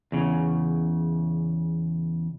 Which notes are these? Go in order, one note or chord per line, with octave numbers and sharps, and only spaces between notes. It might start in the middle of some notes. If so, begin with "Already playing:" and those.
E2 C#3